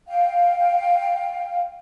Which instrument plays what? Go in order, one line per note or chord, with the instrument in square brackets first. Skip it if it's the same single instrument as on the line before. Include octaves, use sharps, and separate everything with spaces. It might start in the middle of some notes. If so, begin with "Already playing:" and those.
[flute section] F5 G5